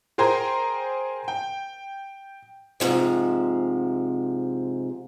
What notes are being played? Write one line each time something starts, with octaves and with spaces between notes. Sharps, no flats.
G#4 A#4 C5 G5 G#5 A#5
G5
G#2 C3 F3